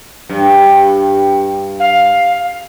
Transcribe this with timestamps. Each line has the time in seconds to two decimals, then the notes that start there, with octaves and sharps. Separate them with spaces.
0.29 G2
1.80 F5